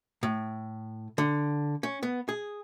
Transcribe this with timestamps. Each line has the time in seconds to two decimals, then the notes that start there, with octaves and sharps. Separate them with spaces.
0.23 A2
1.18 D3
1.83 C#4
2.03 B3
2.29 G#4